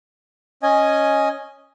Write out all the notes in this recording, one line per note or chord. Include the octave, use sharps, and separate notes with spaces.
C#4 D#5 G#5